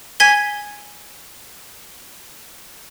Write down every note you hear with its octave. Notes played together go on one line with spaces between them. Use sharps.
G#5 G#6 B6 G7